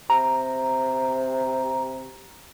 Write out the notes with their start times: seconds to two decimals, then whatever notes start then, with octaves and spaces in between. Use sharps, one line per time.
0.10 C3 A#5